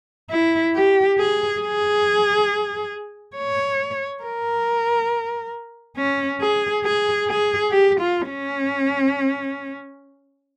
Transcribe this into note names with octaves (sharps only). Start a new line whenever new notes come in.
E4
G4
G#4
G#4
C#5
A#4
C#4
G#4
G#4
G#4
G4
F4
C#4